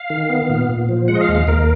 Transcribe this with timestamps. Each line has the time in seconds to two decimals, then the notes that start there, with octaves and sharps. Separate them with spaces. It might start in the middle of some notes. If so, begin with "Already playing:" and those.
Already playing: F5
0.10 D#3
0.29 B3
0.50 A#2
0.69 A#2
0.89 F3
1.08 G#3 F#5
1.15 D#5
1.21 F5
1.29 D#2
1.35 F5
1.47 D#2 A#4